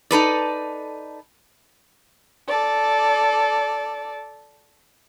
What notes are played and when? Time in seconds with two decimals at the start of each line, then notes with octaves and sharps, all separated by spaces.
0.11 D#4 A4 B4 D5
2.46 A4 D5